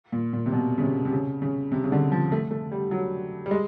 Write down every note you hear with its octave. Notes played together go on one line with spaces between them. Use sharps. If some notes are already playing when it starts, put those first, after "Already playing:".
A#2
A#2
C3
B2
C#3
C3
C3
C#3
C#3
C3
C#3
D3
F3
A3
A3
G3
F#3
G3
G#3